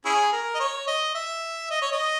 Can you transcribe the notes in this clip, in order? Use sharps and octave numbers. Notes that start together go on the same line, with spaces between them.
C#4 E4 G#4
A#4
D#5
C#5
D#5
E5
D#5
C#5
D#5